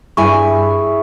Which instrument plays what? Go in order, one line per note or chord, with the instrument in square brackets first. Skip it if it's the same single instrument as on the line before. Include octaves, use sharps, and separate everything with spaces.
[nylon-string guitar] G2 G#5 [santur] E4 G#4 [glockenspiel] C#6